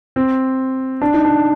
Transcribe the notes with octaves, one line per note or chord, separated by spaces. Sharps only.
C4
D4
D#4
D4